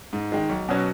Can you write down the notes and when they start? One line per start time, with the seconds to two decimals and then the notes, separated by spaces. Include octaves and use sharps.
0.13 G#2
0.32 D#3 G#3
0.49 B1
0.69 B2 F#3 C#4